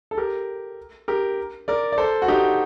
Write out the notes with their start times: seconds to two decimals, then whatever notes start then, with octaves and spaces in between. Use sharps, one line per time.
0.11 A4
0.18 G4 A#4
1.08 G4 A#4
1.68 A#4 D5
1.92 D5
1.98 A4 C5
2.22 F#4
2.28 D#4 G4